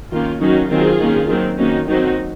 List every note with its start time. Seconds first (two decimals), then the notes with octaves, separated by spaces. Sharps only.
0.12 D#3 A#3 C#4 F4
0.41 D#3 F#3 C#4 D#4 F#4
0.70 D#3 F#3 C4 F4 G#4
1.00 D#3 A#3 C#4
1.29 D#3 F#3 C4
1.58 D#3 A#3 C#4 D#4 F#4
1.87 D#3 F#3 C4 D#4 F#4